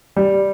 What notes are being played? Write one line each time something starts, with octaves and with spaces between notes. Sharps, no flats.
G3